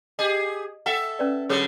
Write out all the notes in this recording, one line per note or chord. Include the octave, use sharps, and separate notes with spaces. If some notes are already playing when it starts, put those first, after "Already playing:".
G4 G#4 D#5
A4 E5 F#5 G5
C#4 B4 D5
D3 F#3 G#4 C#5 D#6